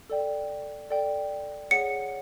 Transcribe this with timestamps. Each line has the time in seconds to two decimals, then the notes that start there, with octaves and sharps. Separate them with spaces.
0.09 A4 D5 G5
0.90 A4 D5 G5
1.71 G#4 C#5 F#5 C#7